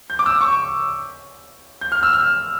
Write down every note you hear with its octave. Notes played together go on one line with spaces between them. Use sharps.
G6
D6
E6
C#6
G6
F6
E6
F6